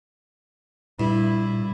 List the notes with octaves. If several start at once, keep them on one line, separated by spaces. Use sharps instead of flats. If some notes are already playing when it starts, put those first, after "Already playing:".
G2 A#2 E4